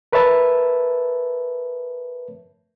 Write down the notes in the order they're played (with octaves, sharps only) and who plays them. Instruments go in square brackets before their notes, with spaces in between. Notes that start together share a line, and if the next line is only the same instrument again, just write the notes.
[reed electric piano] A#4 B4 C#5 E5 A5